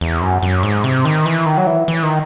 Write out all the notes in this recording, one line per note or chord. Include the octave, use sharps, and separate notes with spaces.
E2
F#2
F#2
G#2
C3
D#3
E3
D#3
F#3
E3
E3
D#3